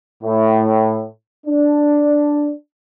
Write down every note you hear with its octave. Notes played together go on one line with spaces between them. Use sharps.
A2
D4